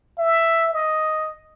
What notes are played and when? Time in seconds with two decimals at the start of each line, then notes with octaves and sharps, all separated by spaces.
0.19 E5
0.74 D#5